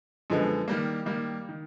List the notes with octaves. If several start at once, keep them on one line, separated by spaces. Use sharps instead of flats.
F#2 D3 F3 G#3 B3
D#3 G3 A#3
D#3 G3 A#3
D#3